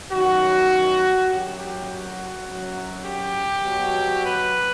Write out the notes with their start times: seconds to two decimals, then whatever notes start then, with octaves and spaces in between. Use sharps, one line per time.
0.11 F#2 D#3 F#3 F#4
1.29 F#2 F#3 G4
1.58 G4
1.88 F#4
2.48 F#2 F#3
3.06 G4
3.65 B2 F#3
4.25 B4